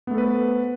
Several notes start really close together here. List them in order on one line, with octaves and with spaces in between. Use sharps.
B3 A3 A4 B4 C5